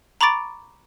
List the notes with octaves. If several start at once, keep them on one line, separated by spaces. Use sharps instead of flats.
A#5 B5 C#6 D6 A6 D7